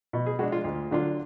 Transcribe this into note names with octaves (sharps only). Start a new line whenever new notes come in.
B2
G#4
G#3 D4 F#4
F4
D2 F4
D3 F#3 D4 F4